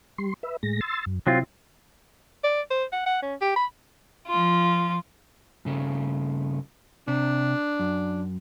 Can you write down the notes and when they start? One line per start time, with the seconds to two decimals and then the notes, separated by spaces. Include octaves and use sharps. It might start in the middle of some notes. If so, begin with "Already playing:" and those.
0.18 G3 C6
0.43 B4 E5
0.63 A2 G#3 A#6
0.81 C6 E6 A6
1.06 F#2
1.27 C3 F#3 C4 E4 F4
2.44 D5
2.70 C5
2.93 F#5
3.06 F#5
3.22 C#4
3.41 G4
3.56 B5
4.28 F3 F4
5.65 G2 C#3 A3
7.08 C3 D4
7.79 F#2